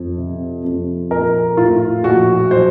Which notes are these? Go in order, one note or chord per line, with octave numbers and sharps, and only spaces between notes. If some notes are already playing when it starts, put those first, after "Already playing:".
Already playing: F2
C3
F2
A#1 A#4
A2 F4
A#1 F#4
F#3 C5